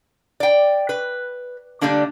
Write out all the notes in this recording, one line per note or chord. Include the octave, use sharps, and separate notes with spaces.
D5 G5
B4
D3 G3 A3 A#3 D4